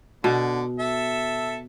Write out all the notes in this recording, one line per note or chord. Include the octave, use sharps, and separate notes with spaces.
B2 D3
A4 E5